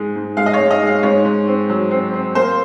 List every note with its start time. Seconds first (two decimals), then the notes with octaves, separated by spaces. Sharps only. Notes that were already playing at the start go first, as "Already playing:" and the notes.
Already playing: G#2 G#3
0.16 G#2
0.37 G#3 F5
0.46 D#5
0.53 C#5
0.59 G#2
0.71 D#5
0.82 G#3
0.87 F5
1.03 G#2 C#5
1.25 G#2
1.47 C4
1.69 F#3
1.91 C4
2.14 C4
2.35 A#3 C5